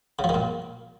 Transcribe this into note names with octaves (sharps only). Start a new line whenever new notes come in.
C#3
F3
D#3
A#2